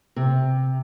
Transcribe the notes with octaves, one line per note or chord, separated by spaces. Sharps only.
C3